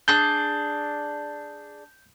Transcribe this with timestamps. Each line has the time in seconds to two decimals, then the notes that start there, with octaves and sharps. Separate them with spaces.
0.08 D4 G#4 F#6 G6